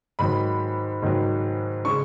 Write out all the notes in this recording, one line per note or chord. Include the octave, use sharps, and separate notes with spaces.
G#2 D#3 F#3 B5
G#2 D#3 F#3
C#3 G#3 C#6